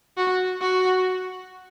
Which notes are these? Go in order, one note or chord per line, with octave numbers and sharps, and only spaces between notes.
F#4
F#4